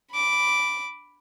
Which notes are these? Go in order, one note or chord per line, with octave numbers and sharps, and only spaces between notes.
B5 D6